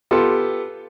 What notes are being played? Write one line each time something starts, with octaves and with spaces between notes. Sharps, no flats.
B3 F4 G4 A4